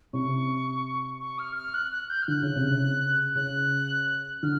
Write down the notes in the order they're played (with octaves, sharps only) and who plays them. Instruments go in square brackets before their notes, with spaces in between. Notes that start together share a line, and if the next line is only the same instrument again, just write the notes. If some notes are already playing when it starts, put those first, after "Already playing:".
[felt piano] C3 [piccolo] C#6
[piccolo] C#6
F6
F6
F#6
F#6
G6
F6
[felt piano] D3 [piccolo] F#6
[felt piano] C#3
C3
C#3
[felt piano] C#3 [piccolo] F#6
[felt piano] D3 [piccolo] F6